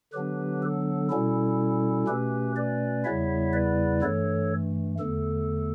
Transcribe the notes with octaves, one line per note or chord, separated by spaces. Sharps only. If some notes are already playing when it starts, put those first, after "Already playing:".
D3 F#3 B3 D4 G4 B4
A4
B2 G3 C#4 E4 A4
B2 A3 C#4 G4 B4
B4 D5
E2 C#3 G3 B3 E4 C#5 E5
B4 D5
G2 E3 A3 A4 C#5
E2 D3 A3 A4